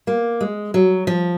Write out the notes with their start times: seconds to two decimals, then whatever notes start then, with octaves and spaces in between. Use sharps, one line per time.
0.07 A#3
0.41 G#3
0.74 F#3
1.07 F3